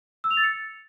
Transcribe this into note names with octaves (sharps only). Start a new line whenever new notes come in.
E6
F7
A6
C#7